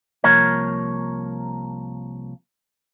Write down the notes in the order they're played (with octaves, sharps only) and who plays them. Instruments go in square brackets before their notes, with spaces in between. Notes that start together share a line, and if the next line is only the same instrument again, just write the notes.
[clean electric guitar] C2 F3 A#3 A#4 C#5